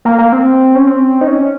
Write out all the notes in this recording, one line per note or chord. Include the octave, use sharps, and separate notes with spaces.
A#3
A#3
C4
C#4
C4
D#4
C#4